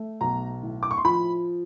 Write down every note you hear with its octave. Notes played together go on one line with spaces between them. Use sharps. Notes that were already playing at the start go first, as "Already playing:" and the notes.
Already playing: A3
B1 A#5
A2
D6
C#6
C6
F3 B5